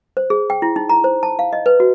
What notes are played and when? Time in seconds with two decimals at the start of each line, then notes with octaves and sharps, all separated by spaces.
0.17 C5
0.30 G#4
0.50 G5
0.62 E4
0.76 D#4
0.89 A#5
1.04 C5
1.23 A5
1.39 F5
1.53 D#5
1.66 B4
1.80 F#4